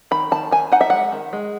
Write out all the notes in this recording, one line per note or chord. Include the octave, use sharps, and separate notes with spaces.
D#3 B5
D#3 A5
D#3 G#5
D#4 F#5
E5
G#3 F#5
D#3
G#3